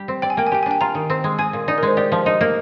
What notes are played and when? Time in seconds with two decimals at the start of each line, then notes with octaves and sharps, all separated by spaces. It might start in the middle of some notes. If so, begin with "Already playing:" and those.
Already playing: G3 G4
0.08 C4
0.22 D5 G5
0.30 G#5
0.37 A#3 G5
0.47 G#5
0.52 G4 G5
0.63 G#5
0.66 D4 G5
0.81 F4 A#5
0.95 D#3
1.10 C4
1.24 G#3
1.39 G#4 G#5
1.53 A#2
1.68 D#4 D5
1.78 A#4
1.83 G#3 C5
1.97 G4 D5
2.12 F3
2.26 D#4 D#5
2.41 A#3